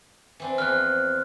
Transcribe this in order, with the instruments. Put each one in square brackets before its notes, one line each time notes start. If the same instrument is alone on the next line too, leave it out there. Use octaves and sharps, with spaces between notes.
[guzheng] E3 C4 D4
[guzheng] E2 F3 [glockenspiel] F6 F#6